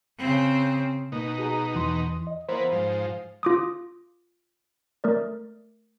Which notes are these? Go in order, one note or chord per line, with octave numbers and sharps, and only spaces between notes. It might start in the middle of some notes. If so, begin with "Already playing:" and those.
C#3 C4
B2 A#3 D#4
F#4 G#4 A#5
E2 E3 C6
D#5
E3 A#3 B3 C5
G#2 F3
F4 D6 D#6
A3 A#4 D5